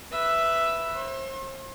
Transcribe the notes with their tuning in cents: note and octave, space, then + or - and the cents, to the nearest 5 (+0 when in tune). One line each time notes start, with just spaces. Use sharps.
B4 +0 E5 +5
C5 +40 C6 +45